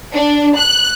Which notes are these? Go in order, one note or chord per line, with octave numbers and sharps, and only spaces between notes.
D4
F#6